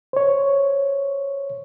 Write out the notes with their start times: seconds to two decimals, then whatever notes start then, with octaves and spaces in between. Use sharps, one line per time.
0.13 C5 C#5